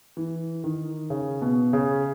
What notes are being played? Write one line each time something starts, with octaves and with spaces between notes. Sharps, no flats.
E3
D#3
C#3
B2
C#3